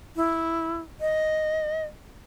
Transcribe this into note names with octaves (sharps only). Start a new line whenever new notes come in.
E4
D#5